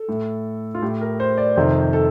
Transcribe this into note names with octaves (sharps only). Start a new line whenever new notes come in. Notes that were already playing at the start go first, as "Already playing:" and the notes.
Already playing: A4
A2
F4
A2 G4
A#4
C5
D5
F2 C3 D#3 C5
A4